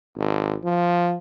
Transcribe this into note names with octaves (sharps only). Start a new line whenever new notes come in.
G#1
F3